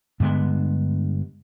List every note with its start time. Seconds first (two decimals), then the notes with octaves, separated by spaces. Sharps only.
0.20 G2 D3 G#3 B3